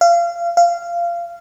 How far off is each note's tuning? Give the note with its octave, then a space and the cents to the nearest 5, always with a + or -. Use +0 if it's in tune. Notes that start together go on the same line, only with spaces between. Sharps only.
F5 -30
F5 -20